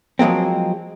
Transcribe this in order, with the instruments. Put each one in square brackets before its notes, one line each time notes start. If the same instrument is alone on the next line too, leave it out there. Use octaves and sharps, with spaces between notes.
[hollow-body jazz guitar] F3 F#3 G#3 A#3 C4